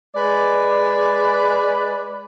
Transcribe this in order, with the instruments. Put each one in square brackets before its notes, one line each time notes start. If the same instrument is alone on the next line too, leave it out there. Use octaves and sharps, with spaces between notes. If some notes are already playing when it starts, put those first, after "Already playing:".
[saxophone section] G#3 B4 D5